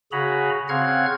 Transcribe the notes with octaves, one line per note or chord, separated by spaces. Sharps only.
C#3 F#4 G#4 A#5 B5
C#3 C4 F5 F#5 F6 G#6